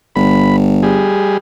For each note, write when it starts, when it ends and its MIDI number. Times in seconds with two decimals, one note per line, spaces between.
0.16 1.11 31
0.16 0.56 83
0.83 1.37 55
0.83 1.37 68